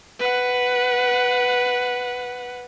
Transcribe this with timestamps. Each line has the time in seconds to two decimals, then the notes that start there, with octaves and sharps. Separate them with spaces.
0.19 B4 F#5